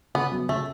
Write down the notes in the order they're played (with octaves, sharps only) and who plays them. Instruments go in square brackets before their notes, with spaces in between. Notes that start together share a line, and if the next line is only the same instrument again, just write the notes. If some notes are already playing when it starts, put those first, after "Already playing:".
[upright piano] C#3 [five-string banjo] B3
[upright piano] F#3 B3
[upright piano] C#3 [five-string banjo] A3